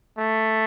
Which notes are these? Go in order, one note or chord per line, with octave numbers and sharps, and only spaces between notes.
A3